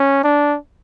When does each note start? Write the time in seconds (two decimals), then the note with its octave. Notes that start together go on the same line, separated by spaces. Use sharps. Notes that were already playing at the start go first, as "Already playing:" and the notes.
Already playing: C#4
0.24 D4